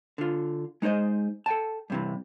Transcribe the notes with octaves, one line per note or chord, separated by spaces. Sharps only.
D3 F4
G#3 D#4 A#4 C5 D#5
A4 G5 A5
G2 C3 E3